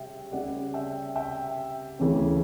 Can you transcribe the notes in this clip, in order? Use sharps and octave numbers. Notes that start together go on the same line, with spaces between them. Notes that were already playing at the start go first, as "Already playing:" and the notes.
Already playing: C#3 G3 E5 G5
C#3 G3 C#4 D5 F#5
E5 G5
E5 G5
D2 C#3 E3 A3 C#4